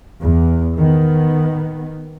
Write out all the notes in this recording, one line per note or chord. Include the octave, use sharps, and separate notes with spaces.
E2
D#3 B3